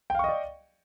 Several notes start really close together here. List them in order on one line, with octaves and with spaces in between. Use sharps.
G5 F5 C#6 D#5 D5